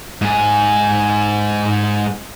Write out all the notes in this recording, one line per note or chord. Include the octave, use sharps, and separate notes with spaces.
G#2 G#4